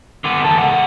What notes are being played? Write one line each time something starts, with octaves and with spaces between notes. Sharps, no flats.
D3 B3
E2 A4
C#2 F#5